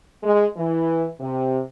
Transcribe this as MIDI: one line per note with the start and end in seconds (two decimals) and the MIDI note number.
0.23 0.44 56
0.57 1.06 52
1.19 1.60 48